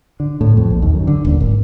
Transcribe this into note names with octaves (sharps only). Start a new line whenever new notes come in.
D3
A2
F2
A#1
D#2
F#2
D3
D#1
G#1